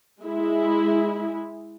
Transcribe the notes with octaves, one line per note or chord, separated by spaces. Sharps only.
G#3 E4